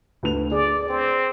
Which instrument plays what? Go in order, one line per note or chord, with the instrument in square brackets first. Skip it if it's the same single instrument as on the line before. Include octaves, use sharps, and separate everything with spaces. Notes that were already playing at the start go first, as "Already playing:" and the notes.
[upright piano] D2 B4 F7
[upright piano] G#4 [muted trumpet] D5
[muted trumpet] C4